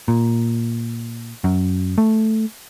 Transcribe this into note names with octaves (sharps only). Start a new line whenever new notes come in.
A#2
F#2
A3